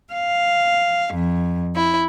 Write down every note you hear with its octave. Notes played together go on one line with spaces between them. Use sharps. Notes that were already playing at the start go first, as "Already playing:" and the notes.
F5
F2
E4